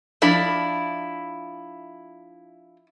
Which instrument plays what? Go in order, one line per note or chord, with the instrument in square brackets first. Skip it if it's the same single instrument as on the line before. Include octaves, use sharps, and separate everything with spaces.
[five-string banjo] F3 D4 B5 [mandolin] E4